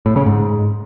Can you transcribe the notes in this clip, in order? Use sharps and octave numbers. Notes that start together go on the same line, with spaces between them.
A2
C#3
G#2